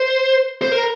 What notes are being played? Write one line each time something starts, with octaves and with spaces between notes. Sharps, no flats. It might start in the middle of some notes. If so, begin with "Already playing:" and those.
Already playing: C5
C5
A#4